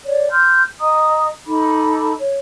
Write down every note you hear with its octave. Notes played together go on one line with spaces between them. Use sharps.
C#5 D5
C6 F6 G6
D#5 A#5 D#6
D#4 A4 B5 D6
C#5